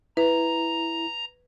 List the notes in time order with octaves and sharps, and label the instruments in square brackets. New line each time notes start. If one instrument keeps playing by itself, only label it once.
[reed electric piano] E4 [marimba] B4 [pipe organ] A#5